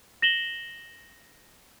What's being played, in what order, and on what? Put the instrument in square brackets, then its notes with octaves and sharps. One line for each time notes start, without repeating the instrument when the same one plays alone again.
[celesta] A#6 E7 F#7 G7